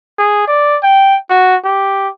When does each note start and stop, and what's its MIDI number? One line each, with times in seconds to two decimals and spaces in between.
0.19 0.48 68
0.48 0.78 74
0.83 1.17 79
1.30 1.56 66
1.65 2.09 67